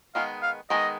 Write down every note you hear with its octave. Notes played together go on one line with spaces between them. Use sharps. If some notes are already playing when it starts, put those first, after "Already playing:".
D#3 G#3 B3 F5
F5
D#3 G#3 B3 D#5